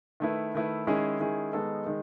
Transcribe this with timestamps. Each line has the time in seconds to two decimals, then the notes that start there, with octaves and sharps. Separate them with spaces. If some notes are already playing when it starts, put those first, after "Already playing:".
0.20 D#3 A3 E4 B4
0.54 D#3 A3 E4 B4
0.87 D#3 G#3 C#4 E4 G#4
1.20 D#3 G#3 C#4 E4 G#4
1.53 D#3 G#3 B3 D#4 A4
1.86 D#3 G#3